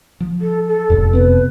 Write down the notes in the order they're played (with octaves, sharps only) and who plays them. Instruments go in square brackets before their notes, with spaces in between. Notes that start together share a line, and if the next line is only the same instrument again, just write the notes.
[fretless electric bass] F3
[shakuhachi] A4
A4
[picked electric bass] F1 [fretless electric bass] E2 A2
[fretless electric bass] C3 B3 C4 [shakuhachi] B4